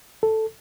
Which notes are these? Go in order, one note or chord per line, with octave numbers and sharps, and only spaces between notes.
A4